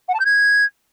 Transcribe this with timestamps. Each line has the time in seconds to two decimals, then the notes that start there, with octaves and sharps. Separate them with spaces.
0.08 F#5
0.14 A5
0.19 G6
0.25 G#6